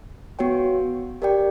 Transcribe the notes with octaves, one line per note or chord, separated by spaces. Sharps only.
B3 F#4 C#5 G5
G4 A#4 D5 G5